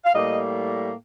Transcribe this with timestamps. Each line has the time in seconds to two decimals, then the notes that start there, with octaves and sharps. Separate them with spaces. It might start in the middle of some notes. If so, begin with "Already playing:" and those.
0.05 F5
0.14 A2 G3 A#3 D#5